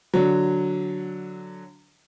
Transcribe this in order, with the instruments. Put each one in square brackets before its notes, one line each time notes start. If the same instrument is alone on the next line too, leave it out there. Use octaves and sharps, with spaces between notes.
[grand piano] D3 F#3